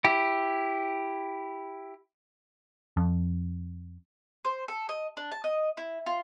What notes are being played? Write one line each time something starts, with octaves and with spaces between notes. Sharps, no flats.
E4 G4
F2
C5
A4
D#5
D4
A5
D#5
E4
F4